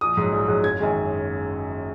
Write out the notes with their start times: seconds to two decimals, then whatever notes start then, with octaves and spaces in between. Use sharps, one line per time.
0.01 A#1 D#6
0.17 G#2 F#3
0.32 A#1
0.48 G#2 F#3
0.63 F#1 G#6
0.79 F#2 D#3 G#3 C#4